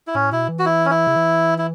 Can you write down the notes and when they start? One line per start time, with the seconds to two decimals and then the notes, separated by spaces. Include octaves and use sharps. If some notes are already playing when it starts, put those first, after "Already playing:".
0.07 E4
0.14 A2 C#4
0.32 B2 E4
0.49 E3
0.59 F#4
0.66 E4
0.86 C#4
0.91 E4
1.07 C#3
1.16 E3
1.58 E4